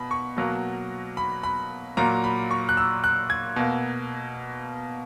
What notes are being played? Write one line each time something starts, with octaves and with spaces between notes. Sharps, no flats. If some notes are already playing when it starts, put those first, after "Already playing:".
Already playing: B2 B5
C#6
B2 F#3 A#3
B5
B5
A#2 F#3 A#3 A#5
B5
C#6
F#6
E6
F#6
G#6
B2 A#3